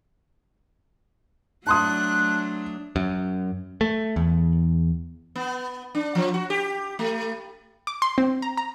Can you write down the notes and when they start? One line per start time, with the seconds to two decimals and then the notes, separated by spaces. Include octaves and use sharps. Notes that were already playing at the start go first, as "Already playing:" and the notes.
1.67 F#3 A3 D4 A5 C6 D#6 F#6
2.96 F#2
3.81 A3
4.16 E2
5.36 B3
5.95 D4
6.15 F3
6.34 F#4
6.50 G4
6.99 A3
7.87 D6
8.02 C6
8.18 C4
8.42 A#5
8.57 A#5